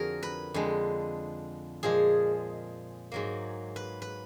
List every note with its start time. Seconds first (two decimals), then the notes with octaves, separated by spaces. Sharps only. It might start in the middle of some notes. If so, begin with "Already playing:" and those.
Already playing: F2 D3 F3 F#4 G#4 A#4
0.23 B4
0.54 F2 D3 G#3
1.83 A#2 F3 G#3 G#4
3.12 G#2 F#3 A#3
3.76 B4
4.02 B4